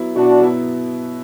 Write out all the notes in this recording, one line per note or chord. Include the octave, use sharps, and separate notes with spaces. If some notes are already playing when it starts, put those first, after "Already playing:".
Already playing: F#3 B3 E4
B2 D4 F#4
F#3 B3 E4